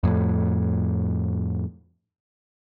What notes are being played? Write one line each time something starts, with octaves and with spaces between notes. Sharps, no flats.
F2 A2